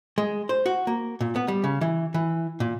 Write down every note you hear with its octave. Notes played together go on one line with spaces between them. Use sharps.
G#3
C5
F#4
A#3
A#2
B3
G3
C#3
E3
E3
A#2